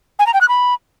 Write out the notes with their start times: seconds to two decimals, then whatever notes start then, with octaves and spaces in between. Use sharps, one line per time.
0.19 G#5
0.26 A#5
0.34 G5
0.41 F#6
0.48 B5